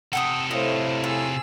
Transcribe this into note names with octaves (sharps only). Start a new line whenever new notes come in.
C3 A4 F#5 G5 D#6
A2 C5 D#5 F5
F4 G#4 E6